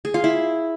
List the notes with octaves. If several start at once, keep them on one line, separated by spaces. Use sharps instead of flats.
G#4
F4
E4